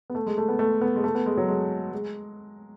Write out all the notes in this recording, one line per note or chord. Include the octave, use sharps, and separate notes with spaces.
B3
A3
G#3
A3
B3
A3
B3
G#3
A3
B3
G#3
F#3
G#3
G#3